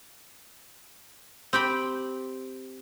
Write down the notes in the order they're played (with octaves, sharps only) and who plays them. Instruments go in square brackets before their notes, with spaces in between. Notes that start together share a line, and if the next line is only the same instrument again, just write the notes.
[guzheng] C4 G4 G5 B5